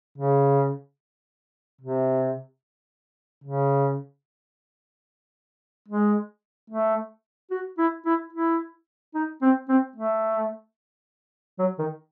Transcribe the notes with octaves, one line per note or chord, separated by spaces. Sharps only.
C#3
C3
C#3
G#3
A3
F#4
E4
E4
E4
D#4
C4
C4
A3
F#3
D#3